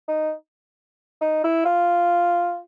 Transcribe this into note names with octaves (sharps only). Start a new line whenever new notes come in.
D#4
D#4
E4
F4